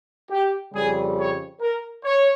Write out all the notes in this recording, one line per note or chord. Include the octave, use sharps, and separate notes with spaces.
G4
F2 C#3 G3 G#4
C#5
A#4
C#5